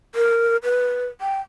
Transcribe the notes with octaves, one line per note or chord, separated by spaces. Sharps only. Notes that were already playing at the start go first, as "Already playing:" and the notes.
A#4
B4
G5